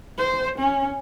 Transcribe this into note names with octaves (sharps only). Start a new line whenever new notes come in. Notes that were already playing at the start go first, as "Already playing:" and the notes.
C5
C#4